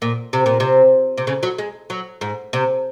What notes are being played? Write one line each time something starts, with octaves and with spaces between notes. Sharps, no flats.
A#2
C3
A#2
C3
C3
C#3
F#3
G#3
F#3
G#2
C3